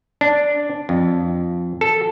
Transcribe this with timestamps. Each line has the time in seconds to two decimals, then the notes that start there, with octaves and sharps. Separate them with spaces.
0.21 D4
0.89 F2
1.81 A4